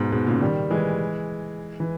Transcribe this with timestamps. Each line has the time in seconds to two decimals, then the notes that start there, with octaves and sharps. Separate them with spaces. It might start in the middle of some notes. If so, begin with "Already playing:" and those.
Already playing: G#2 B2
0.12 G#2 B2
0.27 A#2 C#3
0.41 D#3 G3
0.70 E3 G#3
1.80 E3